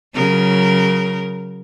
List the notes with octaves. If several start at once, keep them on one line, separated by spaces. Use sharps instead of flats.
C#3 F#3 A#4